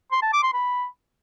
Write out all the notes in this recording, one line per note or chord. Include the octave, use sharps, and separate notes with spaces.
C6
A5
D6
C6
B5